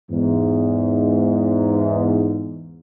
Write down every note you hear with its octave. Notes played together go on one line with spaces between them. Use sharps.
E2 G#2